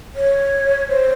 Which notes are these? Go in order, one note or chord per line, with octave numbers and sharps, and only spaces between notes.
C#5
C5